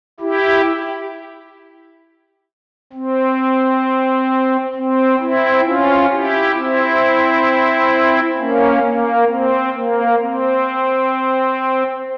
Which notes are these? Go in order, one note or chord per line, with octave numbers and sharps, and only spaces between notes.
E4 G4
C4
C4
C4 E4
C#4 F4
E4 G4
C4 E4
A#3 C#4
A#3
C4
A#3
C4